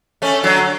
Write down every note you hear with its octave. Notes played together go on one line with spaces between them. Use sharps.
A3 C#4
D3 F#3